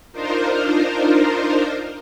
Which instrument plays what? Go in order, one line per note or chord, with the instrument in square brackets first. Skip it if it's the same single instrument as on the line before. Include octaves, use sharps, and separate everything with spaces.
[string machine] D4 D#4 F4 A#4 C5